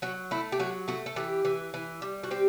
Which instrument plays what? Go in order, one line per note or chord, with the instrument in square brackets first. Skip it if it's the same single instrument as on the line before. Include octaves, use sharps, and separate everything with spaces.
[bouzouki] F#3 F#4
A3 E4
G4
F#3 F#4
A3 F#4
A4
E3 G4
E3
E3
G3
F#4
C4 G4